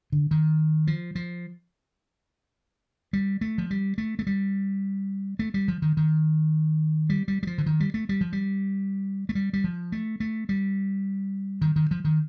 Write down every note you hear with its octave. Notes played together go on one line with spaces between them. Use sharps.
D3
D#3
F3
F3
G3
A3
F3
G3
A3
A3
G3
A3
G3
F3
D#3
D#3
G3
G3
G3
F3
D3
D#3
G3
A3
G3
F3
G3
A3
G3
G3
F3
A3
A3
G3
D#3
D#3
F3
D#3